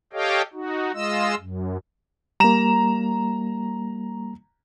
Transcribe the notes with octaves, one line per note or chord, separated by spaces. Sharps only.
G4 A4 C#5 D#5 F5 G5
D#4 F#4
G#3 F4 D#5 E6
F#2
G3 A#3 A#5 E7